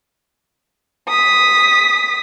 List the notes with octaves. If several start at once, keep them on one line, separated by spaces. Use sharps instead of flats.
D#6 B6